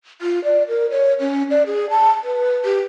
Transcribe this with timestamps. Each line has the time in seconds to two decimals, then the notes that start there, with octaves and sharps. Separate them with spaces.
0.21 F4
0.44 D5
0.68 A#4
0.90 C#5
1.20 C#4
1.50 D5
1.66 G#4
1.90 A5
2.23 B4
2.64 G4